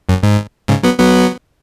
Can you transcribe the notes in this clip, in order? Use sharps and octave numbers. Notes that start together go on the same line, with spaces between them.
F#2
G#2
G#2 C#3
F#3 B3
F#3 B3